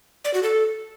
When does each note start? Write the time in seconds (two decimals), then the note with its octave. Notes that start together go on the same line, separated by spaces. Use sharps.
0.25 D5
0.34 F#4
0.43 A4